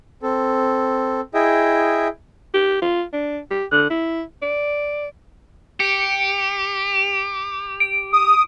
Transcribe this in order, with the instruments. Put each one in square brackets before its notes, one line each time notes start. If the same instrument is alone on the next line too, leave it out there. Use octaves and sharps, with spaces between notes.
[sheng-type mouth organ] C4 A4
E4 G#4 D#5 E5 G5
[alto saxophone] G4
F4
D4
G4
D3
E4
D5
[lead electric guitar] G4 [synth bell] C#7 D7
[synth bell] D7
[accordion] D#6